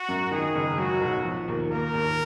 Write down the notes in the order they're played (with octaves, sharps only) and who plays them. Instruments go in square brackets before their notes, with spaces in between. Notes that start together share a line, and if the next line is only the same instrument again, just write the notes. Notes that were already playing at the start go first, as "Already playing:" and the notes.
Already playing: [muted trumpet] F#4
[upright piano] F#2
[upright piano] D#3 [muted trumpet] G#4
[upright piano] F#1
[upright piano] F#3 [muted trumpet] F#4
[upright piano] B1
F3
D#2
[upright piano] A#3 [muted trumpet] A#4
[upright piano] D#2